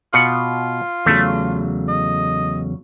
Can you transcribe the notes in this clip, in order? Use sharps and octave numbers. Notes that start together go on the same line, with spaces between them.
B2 F4 F#5
E2 C#3 F#3 A3
D#5